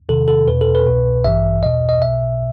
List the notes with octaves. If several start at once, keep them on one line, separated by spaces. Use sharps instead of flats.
E2 C3 D#3 A4
A4
E2 B2 B4
A4
B4
C2 B2
A1 G2 E3 E5
E2 B2 D#5
D#5
B1 B2 E5